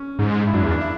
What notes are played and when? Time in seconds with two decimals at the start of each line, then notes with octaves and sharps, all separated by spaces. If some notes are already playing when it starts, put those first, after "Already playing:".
Already playing: C#4
0.19 G#2
0.47 E4
0.53 F#2 D4
0.64 E2
0.71 D4
0.81 E4